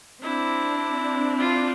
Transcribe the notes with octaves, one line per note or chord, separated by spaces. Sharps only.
C4 D4 E4
F4